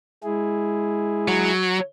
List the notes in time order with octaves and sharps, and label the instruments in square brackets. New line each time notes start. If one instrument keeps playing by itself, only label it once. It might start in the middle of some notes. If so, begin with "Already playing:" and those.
[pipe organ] G#3 E4 G#4
[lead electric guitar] F#3